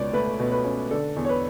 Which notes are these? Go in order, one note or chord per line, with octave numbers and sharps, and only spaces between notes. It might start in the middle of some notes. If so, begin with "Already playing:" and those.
Already playing: C#2 B2 C#4 C#5 D5
A3 B4
B2
B4
C#4
D3 A4
E2
C#5
B4